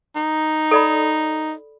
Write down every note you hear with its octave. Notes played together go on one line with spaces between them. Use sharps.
D#4
A4 D5 B5